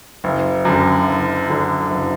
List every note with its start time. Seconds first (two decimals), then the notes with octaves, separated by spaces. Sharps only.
0.24 F#1
0.65 F#2 D3
1.07 F#1
1.49 F#2 D3
1.90 F#1